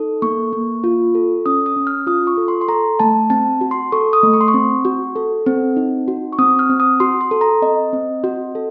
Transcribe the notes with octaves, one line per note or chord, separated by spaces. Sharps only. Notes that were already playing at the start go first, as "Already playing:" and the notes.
Already playing: D#4 A4
A#3 C#6
A#3
F4
A4
C#4 D#6
D#6
C#4
F6
F4 D#6
C#6
A4
C6
C6
A4 A#5
A3 A5
C4 A5
F#4
C6
A4 C#6
D#6
A3
C#6
C6
C#6
C4
F#4
A4
C4
D#4
F#4
C#6
C4 D#6
F6
C4
D#6
F#4 C6
C6
A4
A#5
C4 D#5
C4
F#4
A4